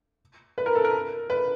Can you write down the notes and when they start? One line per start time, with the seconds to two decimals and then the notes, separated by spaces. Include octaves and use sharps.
0.58 B4
0.66 A#4
0.75 A4
0.85 A#4
1.30 B4